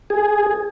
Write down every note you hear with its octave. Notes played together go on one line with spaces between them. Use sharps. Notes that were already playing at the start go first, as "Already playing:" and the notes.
G#4